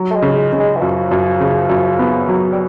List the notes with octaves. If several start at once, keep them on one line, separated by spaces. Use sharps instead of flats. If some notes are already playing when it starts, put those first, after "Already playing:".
Already playing: F#3
A3
G#3
C#3
G#3
C#3
G#3
E3
F#2 F3
F#2
C#3
F#2
B3
F#3
G3